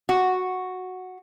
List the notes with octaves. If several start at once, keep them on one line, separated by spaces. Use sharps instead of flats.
F#4